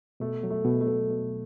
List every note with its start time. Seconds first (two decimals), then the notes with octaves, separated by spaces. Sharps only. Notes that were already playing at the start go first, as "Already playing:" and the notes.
0.20 B2 A3
0.43 F#3
0.50 A3
0.65 B2
0.81 A3
0.87 B2
1.10 B2